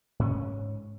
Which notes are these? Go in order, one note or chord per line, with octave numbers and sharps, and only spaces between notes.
G#2 C#4